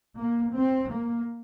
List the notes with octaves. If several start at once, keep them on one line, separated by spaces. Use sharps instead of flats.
A#3
C4
A#3